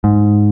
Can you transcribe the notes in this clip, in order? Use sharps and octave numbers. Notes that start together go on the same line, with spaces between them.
G#2